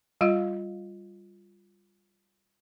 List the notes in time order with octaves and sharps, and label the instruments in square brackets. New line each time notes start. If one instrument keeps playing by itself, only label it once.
[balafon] G3 F4 D#5 F5